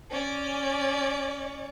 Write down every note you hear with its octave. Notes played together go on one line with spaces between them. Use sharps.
C#4 D5